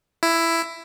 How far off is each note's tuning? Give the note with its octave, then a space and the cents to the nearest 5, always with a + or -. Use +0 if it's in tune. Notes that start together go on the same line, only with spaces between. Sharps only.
E4 +10